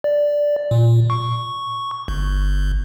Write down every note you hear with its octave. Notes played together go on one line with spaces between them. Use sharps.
D5
A#2
C#6
G1